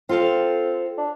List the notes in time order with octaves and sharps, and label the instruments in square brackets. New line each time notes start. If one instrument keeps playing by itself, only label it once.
[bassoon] C4 [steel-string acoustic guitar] F4 A4 F5
[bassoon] D4